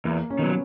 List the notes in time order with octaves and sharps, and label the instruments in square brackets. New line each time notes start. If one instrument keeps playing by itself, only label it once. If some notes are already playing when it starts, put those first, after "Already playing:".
[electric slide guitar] E2 [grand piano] A#3
[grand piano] C#4
[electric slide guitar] D#3 F#3 [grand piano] B3